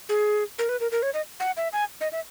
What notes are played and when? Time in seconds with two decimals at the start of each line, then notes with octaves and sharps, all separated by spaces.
0.09 G#4
0.59 A#4
0.69 B4
0.80 A#4
0.92 A#4
1.03 C#5
1.14 D#5
1.40 F#5
1.57 E5
1.73 G#5
2.01 D#5
2.12 E5